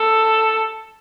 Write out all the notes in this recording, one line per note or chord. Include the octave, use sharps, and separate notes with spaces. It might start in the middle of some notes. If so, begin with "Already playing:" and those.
Already playing: A4